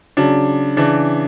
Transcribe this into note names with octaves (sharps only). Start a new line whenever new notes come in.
C#3 F#3 D4
C#3 E3 D4